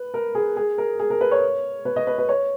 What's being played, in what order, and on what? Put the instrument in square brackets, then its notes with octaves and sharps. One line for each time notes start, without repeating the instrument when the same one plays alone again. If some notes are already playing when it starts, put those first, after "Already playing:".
Already playing: [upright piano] B4
A#4
G#4
G#4
A#4
G#4
A#4
B4
C#5
B4
D#5
B4
B4
C#5